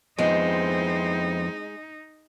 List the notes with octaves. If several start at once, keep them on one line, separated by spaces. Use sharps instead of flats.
F2 G#3 B3 C4 D#4 E4 C5